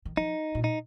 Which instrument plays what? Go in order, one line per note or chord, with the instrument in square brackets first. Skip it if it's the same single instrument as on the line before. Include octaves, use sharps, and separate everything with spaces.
[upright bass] D#3
[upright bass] F3 [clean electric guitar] D#4
[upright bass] A#2
[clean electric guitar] D#4